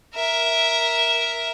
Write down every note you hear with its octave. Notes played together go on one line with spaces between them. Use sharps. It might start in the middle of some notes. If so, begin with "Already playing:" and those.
A#4 E5